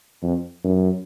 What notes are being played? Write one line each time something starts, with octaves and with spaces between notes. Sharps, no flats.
F2
F#2